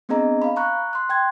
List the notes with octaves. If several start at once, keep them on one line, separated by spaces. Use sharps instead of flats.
B3 C4 D4 G#4 D#5 A#5
F5 B5
A#5 C#6 F#6
C6 F#6
G5 C6 G#6